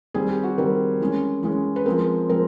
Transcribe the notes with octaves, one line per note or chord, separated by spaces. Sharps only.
D#3 G3 C4 G#4
G4
F#4
D#3 G3 C4 A#4
E3 G#3 C#4
E3 G#3 C#4
B4
F3 G#3 C4 A#4
F3 G#3 C4 A#4